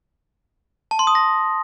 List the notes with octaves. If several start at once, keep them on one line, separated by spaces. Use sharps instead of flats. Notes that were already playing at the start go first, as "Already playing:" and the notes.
A5
C6
D#6
A#6